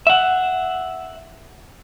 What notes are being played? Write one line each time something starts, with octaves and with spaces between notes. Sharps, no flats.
E5 F#5